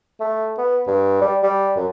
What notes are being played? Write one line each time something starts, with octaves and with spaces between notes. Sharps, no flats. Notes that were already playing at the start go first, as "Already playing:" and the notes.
A3
B3
G2
G3
G3
F#2